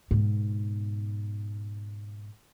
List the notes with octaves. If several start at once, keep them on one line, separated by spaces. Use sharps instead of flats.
G#2 B2